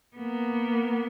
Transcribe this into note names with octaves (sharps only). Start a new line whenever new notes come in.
A#3 B3